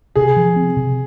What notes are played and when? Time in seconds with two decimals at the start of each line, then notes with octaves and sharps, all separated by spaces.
0.16 C3 G#4
0.36 F3
0.56 C4
0.77 C3